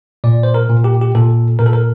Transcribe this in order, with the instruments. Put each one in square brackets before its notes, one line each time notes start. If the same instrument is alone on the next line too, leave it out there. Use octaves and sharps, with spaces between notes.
[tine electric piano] A#2 D5
C5
A#4
A#2
G4
G4
A#2 A4
A#2 A#4
A4
A#4